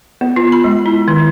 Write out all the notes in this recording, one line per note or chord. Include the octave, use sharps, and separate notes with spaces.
B3
F4
B5
G#3
E4
D#3